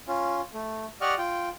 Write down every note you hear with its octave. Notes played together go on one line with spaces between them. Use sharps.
C#4 F4
A3
G4 D5 D#5 F#5 C#6 F6
F4 G5